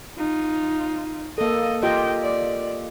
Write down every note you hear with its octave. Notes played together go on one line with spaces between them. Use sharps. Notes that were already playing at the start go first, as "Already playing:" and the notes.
D#4 F4
A#3 A4 D#5
F4 G4 D#5 G5
D5